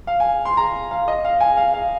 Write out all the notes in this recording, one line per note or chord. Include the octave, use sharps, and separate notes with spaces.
F5
G#5
C6
A#5
F5
D#5
F5
G#5
F5
F5